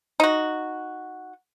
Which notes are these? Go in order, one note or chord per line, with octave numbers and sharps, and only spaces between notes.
D#4 F#4